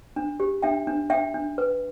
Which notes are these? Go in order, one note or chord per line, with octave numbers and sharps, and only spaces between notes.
D4
G4
D4 E5 G5
D4
D4 E5 G5
D4
B4